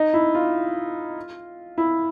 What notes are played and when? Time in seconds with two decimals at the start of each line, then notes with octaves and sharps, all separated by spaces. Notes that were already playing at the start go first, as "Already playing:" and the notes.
Already playing: D#4
0.14 E4
0.35 F4
1.78 E4